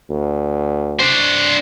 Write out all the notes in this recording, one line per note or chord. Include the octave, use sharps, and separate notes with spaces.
D2
D4 C5